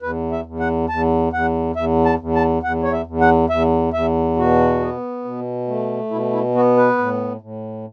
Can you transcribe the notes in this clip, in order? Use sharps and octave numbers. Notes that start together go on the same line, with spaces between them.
E2 B4
E5
E2
F#5
E2 A5
E2 F#5
E2 E5
A5
E2
A5
E2 F#5
C#5
E5
E2
F#5
E2 E5
E2 E5
B2 F#4
B3
B2
A3
B2 E4
E4
B3 F#4
B4
A2
A2